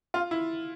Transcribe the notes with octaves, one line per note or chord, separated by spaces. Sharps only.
F4
E4